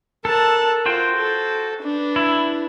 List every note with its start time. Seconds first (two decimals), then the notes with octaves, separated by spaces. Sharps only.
0.25 A4 A#4 A5 F#6
0.86 F4 F#4 C5 G5
1.16 A4
1.82 D4 B4
2.16 E4